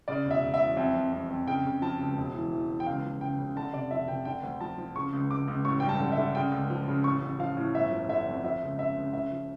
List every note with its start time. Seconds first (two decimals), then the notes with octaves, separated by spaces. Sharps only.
0.08 C#3 D5
0.25 E1
0.31 E5
0.43 E1
0.54 E5
0.61 E2
0.77 F2 E5
0.94 F2
1.13 F2
1.30 F2
1.47 C#3 G5
1.65 C#3
1.82 F3 A5
1.99 C#2
2.17 E1
2.34 E3
2.52 E3
2.70 E3
2.80 G5
2.86 C#2 F5
3.04 F3
3.21 C#3 G5
3.39 C#3
3.56 D3 A5
3.73 F1 D5
3.91 F3 E5
4.08 F1 G5
4.25 D3 G5
4.43 D2
4.60 F3 A5
4.78 F3
4.95 C#3 C#6
5.13 C#2
5.31 C#2 D6
5.48 C#2
5.65 A1 C#6
5.80 G2 G5
5.89 A5
6.00 D3
6.12 D3 E5
6.35 C#3 G5
6.52 C#2
6.70 F3
6.88 C#3
7.04 A1 C#6
7.22 A1
7.39 F3 F5
7.57 A2
7.75 G1 E5
7.91 F3
8.09 D3 E5
8.26 F2
8.43 F3 E5
8.62 C#2
8.79 C#3 E5
8.96 C#2
9.13 C#3 E5
9.31 F3